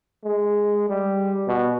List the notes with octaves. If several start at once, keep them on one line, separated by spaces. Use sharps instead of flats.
G#3
G3
B2